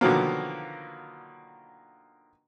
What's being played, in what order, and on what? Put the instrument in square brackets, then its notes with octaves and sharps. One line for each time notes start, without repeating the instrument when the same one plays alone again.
[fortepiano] B2 D3 D#3 F3 F#3 A#3